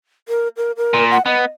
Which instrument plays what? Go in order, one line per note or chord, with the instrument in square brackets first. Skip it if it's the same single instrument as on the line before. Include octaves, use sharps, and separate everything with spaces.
[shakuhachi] A#4
A#4
A#4
[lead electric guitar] A#2
[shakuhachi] F#5
[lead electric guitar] B3 [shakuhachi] D#5